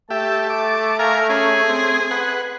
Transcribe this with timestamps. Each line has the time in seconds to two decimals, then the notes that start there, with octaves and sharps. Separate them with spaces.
0.11 A3 G4 E5 A5
0.50 D6
0.99 A#4 F5 G#5 A#5
1.29 C#4 G#4
1.69 C4
2.11 B4 F#5